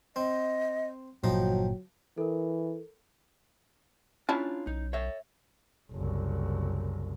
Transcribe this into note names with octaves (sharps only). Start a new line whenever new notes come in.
C4 D#5
G1 A#2 F3 F#3 D#4 G5
E3 A4 A#4
C#4 D4 E4 F4 A5
B1 D#4
C#5 E5
F#1 C2